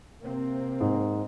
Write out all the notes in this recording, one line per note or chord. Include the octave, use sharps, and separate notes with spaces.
C3 A#3 C4
G#2